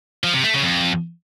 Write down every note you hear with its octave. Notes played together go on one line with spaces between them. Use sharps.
F3
C3
A3
C#3
F2